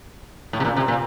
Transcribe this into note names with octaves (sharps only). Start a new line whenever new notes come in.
A2
C3
A#2
C3
A#2